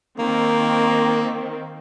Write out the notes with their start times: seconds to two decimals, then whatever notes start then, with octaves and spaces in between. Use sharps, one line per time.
0.19 D#3 A#3 C4